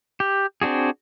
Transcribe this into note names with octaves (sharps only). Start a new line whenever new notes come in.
G4
C4 D4 F#4 G#4